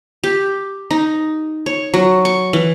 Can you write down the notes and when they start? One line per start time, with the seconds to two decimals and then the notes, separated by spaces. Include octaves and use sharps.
0.24 G4
0.91 D#4
1.66 C#5
1.94 F#3
2.25 C#6
2.53 E3